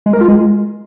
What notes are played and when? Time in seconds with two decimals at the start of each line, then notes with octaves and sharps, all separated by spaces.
0.06 G#3
0.13 A#4
0.21 F4
0.28 G#3